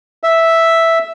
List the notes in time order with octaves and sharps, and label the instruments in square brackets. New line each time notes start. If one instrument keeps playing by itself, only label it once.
[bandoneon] E5